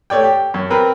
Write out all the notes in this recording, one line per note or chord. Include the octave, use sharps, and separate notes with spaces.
A3 C#5 D5 G5
G4
F#2
C4 A#4 B4